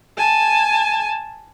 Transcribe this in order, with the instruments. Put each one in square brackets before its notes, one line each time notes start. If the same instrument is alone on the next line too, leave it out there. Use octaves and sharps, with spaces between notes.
[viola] G#5 A5